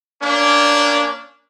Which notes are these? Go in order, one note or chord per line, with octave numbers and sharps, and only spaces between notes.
A#3 C#4 D4